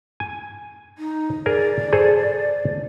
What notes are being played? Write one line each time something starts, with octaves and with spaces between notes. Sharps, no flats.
G#5
D#4
G#4 A#4 D5
G#4 A4 C5